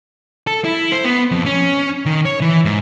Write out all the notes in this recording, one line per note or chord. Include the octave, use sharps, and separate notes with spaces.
A4
E4
C5
B3
F2
C#4
D#3
C#5
E3
G#2